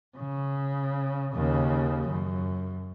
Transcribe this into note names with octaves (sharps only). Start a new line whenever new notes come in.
C#3
D#2 C#3
F#2